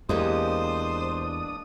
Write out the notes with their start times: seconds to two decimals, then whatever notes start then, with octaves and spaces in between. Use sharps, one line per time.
0.09 E2 G#3 A#3 D4 G4 C5 D#6